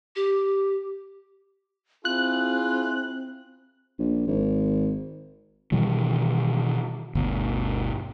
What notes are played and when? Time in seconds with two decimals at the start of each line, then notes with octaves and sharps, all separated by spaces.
0.16 G4
2.05 C4 E4 F4 G#4 F#6
3.99 A#1
4.27 G#1
5.72 B2 D#3 E3 G3
7.15 G1 D2 B2